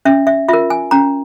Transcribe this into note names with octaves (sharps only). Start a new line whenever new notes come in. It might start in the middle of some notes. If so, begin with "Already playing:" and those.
C#4 E5
E5
F4 A#4 E5
G#5
C#4 A#5